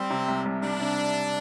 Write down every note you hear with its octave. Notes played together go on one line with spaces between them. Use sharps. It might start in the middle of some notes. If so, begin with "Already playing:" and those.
Already playing: G3 C4
C3
C2
C2
G3 D4
C3